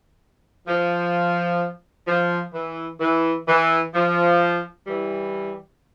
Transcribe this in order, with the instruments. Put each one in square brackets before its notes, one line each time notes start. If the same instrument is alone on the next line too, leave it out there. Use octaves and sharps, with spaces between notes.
[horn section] F3
F3
E3
E3
E3
F3
E3 G3